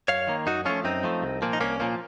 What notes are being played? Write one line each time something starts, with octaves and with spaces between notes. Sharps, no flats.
F#2 C#5 F5
D#3 A#3
F#2 D#4 F#4
F3 A3 C#4 F4
F#2 C4 D#4
F3 A3
C2
A#2 F3 A#3
D#4
C2 A#3 C#4
A#2 F3 A#3